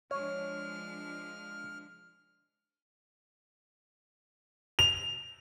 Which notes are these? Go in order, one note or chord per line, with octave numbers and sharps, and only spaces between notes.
F3 G#3 D4 C#5 F6
F7